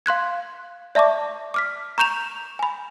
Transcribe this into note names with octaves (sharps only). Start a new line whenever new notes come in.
F5 C6 F#6 G#6
D5 E5 A5 C#6 D6
D6 F6 B6
A#5 C#6 G6 E7 F7
G#5 B5